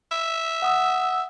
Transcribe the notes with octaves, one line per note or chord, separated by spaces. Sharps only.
E5
F#5 D#6 E6